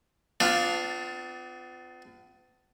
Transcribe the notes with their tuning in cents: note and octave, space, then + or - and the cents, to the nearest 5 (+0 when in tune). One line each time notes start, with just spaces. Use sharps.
B3 +45 D4 +0 F4 +0